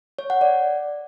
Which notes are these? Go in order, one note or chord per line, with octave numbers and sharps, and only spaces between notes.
C#5
F#5
D5